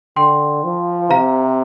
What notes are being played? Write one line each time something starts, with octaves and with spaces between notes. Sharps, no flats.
D3 G5 C6
F3
C3 F5 A#5